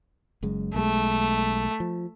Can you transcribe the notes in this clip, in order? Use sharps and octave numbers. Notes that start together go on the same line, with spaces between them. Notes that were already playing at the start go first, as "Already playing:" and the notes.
F#1 F#2 G#3
B1 G#3 A3
F3